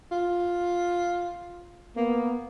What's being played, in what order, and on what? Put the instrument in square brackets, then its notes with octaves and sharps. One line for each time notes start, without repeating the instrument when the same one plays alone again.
[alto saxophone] F4
[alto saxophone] A#3 [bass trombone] B3